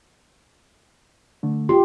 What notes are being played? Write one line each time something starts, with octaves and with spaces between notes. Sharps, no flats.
D3 A3
F4 G4 C6